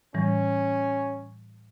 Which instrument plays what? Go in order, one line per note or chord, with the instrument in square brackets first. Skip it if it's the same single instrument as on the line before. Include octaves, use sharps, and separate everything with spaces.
[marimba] A2 E3 G3 [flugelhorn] C#4